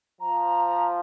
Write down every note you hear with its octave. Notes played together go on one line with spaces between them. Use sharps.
F3 A#5